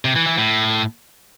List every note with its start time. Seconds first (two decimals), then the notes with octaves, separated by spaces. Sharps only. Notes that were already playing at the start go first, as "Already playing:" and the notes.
0.05 C3
0.16 E3
0.27 E3
0.38 A2